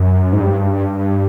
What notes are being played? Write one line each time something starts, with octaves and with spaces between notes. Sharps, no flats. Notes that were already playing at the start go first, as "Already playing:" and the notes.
Already playing: F#2
G#2
G2